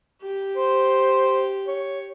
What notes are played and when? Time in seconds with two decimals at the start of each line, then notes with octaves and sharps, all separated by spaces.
0.22 G4
0.56 C5
1.67 C#5